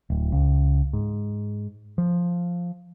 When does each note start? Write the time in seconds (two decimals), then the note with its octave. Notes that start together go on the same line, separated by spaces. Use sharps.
0.10 D1
0.32 C#2
0.93 G#2
1.98 F3